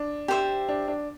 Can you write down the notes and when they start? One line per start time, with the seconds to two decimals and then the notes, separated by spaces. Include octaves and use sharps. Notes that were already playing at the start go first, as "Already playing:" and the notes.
Already playing: D4
0.28 G4 C5 E5
0.69 D4
0.88 D4